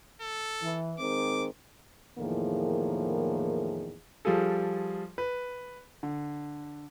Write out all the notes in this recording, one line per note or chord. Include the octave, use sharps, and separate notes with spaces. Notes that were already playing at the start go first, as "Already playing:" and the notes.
A4
E3
D#3 G#3 C4 D6
E2 A2 D#3 F3 A#3 G#4
F3 G3 F4 G#4 A4
B4
D3